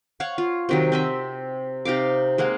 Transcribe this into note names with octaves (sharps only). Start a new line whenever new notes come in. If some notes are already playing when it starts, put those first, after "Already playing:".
C#5 F5 F#5 C#6
F4
C3 D#3 F#3
C4 D#5 E5
C3 D#4 F5 D6
G#3 A#3 F5 F#5